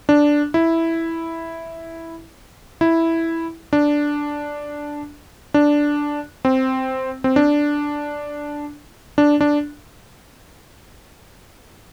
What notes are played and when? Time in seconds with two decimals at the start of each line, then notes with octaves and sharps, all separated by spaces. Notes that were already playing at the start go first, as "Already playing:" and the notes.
0.09 D4
0.54 E4
2.81 E4
3.73 D4
5.54 D4
6.45 C4
7.24 C4
7.36 D4
9.18 D4
9.41 D4